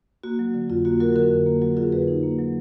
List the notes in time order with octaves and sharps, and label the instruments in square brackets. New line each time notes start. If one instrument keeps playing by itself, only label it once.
[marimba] A#3 F#4
F#3
D3
F2 F4
A#3 F#4
F#3 F#4 A#4
D3 F#4 A#4
F2
A#3
F#3 F#4
D3 F4 G#4
F2 G#4 B4
D#4
A#3
F#3